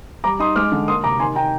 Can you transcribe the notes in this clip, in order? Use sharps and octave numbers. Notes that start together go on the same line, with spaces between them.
G3 A#5 D6
D#4 C6 D#6
G#3 D6 F6
D3
A#3 C6 D#6
C3 A#5 D6
D#3 G#5 C6
D#4 G5 A#5